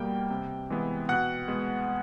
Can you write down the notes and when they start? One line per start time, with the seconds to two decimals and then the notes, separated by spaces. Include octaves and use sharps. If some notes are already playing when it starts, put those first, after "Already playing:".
Already playing: B2 G3 A#3 G5
0.30 C3
0.70 E3 G#3 B3
1.09 B2 F#5 F#6
1.48 G#3 B3